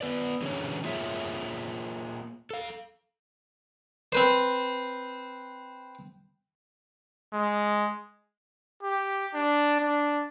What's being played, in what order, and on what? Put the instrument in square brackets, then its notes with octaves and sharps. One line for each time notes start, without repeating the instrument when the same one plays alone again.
[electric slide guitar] B3 B4 D5
D3 E3 F#3 C#4 G#4 C#5
A#3 F4 G#4 C#5 E5
A4 F5
[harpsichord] C4 B4 C5
[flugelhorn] G#3
[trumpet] G4
D4
D4